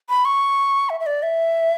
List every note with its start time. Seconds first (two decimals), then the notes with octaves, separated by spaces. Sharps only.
0.09 B5
0.25 C#6
0.90 E5
1.00 E5
1.06 D5
1.23 E5